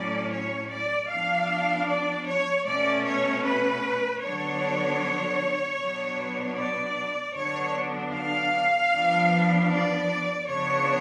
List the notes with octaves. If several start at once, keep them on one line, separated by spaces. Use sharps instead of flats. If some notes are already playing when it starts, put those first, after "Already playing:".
Already playing: A2 F#3 C#4 D5
C#5
D5
F3 B3 D4 F5
D5
C#5
B2 A3 C#4 D5
C#5
B4
D3 F#3 B3 D4 C#5
B2 F#3 B3 D4
D5
D3 F#3 B3 D4 C#5
F5
F3 B3 D4
D5
C#3 F3 B3 D4 C#5